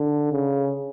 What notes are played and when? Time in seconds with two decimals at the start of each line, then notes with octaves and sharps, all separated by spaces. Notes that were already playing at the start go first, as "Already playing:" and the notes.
Already playing: D3
0.32 C#3